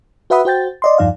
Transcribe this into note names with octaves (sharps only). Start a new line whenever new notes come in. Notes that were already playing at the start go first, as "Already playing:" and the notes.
F#4 B4 E5 F#5 B5 D#6
F#4 C5 G5 G6 A6
D5 D#5 C6
E2 G2 F3 D#4 D5 F5